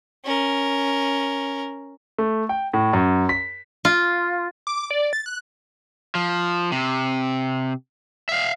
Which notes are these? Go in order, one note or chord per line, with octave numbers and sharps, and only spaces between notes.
C#4 A#4
A3
G5
A2
F#2
B6
F4
D6
D5
A6
F#6
F3
C3
E5 F5